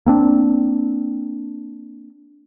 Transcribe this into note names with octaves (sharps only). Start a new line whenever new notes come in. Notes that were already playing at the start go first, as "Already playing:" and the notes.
A#3 C4 D4